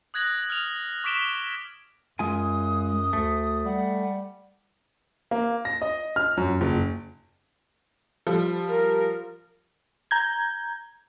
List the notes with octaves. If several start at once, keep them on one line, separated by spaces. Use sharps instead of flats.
D#6 F#6 G#6 A#6 F#7
F6 F7
C#6 D6 B6 D7 E7 G7
F#2 G#3 F4 G#5 D#6
D2 A3
G3 F#5
A#3
A#6
D#5
F6
F#2
F#1
F3 G3
A#4
A#5 G6 G#6